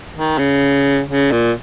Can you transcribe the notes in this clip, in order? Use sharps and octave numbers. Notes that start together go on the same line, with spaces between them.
D#3
C#3
C#3
A#2